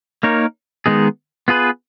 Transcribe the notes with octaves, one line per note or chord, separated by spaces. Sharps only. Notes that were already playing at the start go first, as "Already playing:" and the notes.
A#3 D#4 A#4 C#5
D#3 G#3 B3 D#4 G#4
B3 F4 G#4 B4